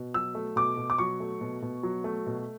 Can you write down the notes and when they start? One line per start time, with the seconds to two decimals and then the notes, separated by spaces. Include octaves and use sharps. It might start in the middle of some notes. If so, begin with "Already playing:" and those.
Already playing: B2
0.14 F#3 E6
0.35 A3
0.56 B2 D6
0.77 B2
0.90 D6
0.98 F#3 C#6
1.20 A3
1.41 B2
1.62 B2
1.83 F#3
2.04 A3
2.26 B2